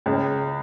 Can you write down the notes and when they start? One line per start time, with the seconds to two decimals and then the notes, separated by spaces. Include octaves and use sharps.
0.06 C#2